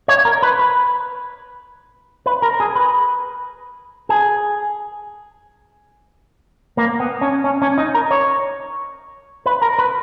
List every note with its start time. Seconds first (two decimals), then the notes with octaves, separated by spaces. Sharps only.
0.08 C#5
0.25 A#4
0.42 B4
0.59 B4
2.26 B4
2.42 A#4
2.60 G#4
2.75 B4
4.09 G#4
6.77 A#3
7.00 B3
7.21 C#4
7.44 C#4
7.62 C#4
7.78 D#4
7.95 A#4
8.11 C#5
9.46 B4
9.62 A#4
9.79 B4